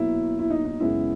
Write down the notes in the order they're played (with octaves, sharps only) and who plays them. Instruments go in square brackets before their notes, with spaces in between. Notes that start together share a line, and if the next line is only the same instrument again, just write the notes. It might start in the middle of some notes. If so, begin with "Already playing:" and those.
Already playing: [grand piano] B2 F#3 A#3 E4
E4
D#4
D#4
F#2 C#3 G#3 B3 E4